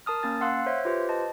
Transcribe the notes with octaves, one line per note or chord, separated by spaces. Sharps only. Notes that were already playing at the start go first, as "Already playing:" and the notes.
A#4 A5 D#6 F6
A#3 C#4 A6
F5 F#5 C6 E6 F#6
C5 C#5 E5
F4 G4 B4 C5
D#5 A5